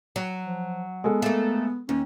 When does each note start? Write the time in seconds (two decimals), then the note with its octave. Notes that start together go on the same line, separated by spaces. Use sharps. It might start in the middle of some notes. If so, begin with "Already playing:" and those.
0.16 F#3
0.46 F3
1.04 G#3 B3 A4
1.22 A3 A#3
1.89 D#2 C#4